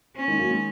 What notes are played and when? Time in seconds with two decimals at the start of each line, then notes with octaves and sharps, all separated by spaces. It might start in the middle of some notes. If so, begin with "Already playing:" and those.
0.16 C#4
0.28 D#3 G#3
0.39 F#3 A#3
0.50 D#3 G#3